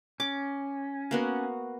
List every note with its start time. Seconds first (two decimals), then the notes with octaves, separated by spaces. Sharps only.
0.20 C#4 D6
1.11 A#3 B3 F#4